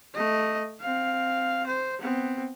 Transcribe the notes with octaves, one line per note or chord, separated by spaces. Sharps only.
A3 D#5
C4 F5
C5
B3 C4